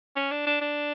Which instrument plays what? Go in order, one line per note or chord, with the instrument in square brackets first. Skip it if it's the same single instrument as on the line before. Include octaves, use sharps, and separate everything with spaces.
[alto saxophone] C#4
D4
D4
D4